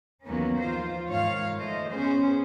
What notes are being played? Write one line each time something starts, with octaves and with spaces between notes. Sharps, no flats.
D#2 D#3 F#3 A#3 B3 C#4
F3 F4 C5
G#2 D#3 C#5 F5
F3 A3 C5 D#5
B3 C#4 G#4 C5